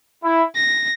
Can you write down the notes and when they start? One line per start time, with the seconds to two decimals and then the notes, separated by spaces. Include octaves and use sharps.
0.24 E4
0.55 A#6